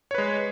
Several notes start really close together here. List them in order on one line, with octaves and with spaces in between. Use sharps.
C#5 B4 G#3